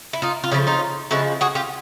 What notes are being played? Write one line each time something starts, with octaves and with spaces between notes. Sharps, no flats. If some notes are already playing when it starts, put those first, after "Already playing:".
E4
D#4 F4
F4
C#3 F3 A3 D4 E4
D#4 F4
C#3 F3 G#3 E4 F#4
F#4 G#4
F4 G4